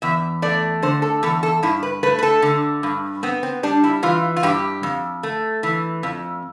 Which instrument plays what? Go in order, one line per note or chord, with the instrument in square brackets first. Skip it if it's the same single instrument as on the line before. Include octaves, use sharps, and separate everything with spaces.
[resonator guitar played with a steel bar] E2 E5
A3 D5
D3 C5
A4
E2 A4
A4
G2 E4
B4
A3 B4
B4
A4
D3
G2
B3 C4
C4
G3 D4
E4
E3 F4
F4
G2 G4
F2
A3
E3
F2